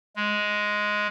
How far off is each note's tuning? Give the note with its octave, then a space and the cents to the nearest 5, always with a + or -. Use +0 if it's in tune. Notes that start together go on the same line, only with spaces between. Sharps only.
G#3 +5